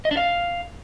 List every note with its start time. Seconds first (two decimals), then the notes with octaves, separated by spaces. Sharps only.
0.05 D#5
0.11 D4
0.17 F5